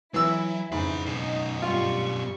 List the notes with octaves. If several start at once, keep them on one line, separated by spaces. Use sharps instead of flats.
E3 F#3 E4 E6
F2 G#2 C#3 E3 G#4 B5
F#2 B2 D#4
G2 G3 F4 C#6